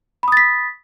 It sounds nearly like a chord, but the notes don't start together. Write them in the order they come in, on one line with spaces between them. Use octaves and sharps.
B5 D#6 A6 B6